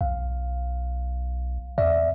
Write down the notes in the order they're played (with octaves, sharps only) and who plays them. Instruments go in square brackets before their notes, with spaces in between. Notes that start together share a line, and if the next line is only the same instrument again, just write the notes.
[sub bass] B1 [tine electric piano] F5
[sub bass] E2 [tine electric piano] D5 E5